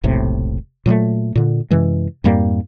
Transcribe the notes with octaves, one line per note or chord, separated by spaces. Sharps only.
E1 B1 A2 C3
A#2 F#3 G#3 A3
A#2 D3
F#2 C3 E3 G#3
F2 G#2 G3 A#3